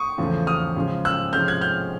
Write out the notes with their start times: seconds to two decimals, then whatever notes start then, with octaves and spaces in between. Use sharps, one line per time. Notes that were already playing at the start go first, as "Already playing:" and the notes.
Already playing: C#6 D#6
0.18 E2 C#3 F3 A3
0.47 D#6 F6
0.76 C#3 F3 G#3
1.05 E6 F#6
1.33 C3 F3 G#3 C#4 F6 G6
1.48 F#6 G#6
1.61 F6 G6